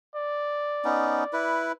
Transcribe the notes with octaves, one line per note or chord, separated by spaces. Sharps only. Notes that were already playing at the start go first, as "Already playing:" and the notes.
D5
B3 C#4 D#4
E4 B4